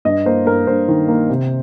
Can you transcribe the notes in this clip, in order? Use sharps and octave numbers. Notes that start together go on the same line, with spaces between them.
G2 D#5
A#3 C5
G2 A#4
G2 C5
D#3
A#3
C3